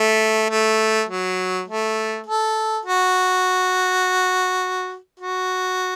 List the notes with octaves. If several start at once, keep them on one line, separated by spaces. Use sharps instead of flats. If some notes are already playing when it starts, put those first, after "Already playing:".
Already playing: A3
A3
F#3
A3
A4
F#4
F#4